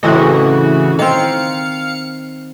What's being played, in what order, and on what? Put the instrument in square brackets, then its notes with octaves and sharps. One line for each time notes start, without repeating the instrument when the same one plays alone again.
[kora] A2 C4 D#5 [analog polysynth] C#3 E3 F#4
[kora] D#3 C4 [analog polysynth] F5 C#7